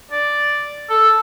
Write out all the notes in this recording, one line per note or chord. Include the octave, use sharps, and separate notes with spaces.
D5
A4